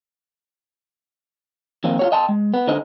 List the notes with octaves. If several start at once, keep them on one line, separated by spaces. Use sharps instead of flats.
F2 D#3 A#3 C4
F4 F#4 C#5
D#5 G5 A5 C6
G#3
B3
D3 D#4 C5 D#5